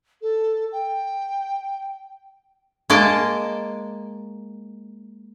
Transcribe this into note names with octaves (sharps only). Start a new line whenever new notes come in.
A4
G5
G#3 A#3 D5 D#5 A5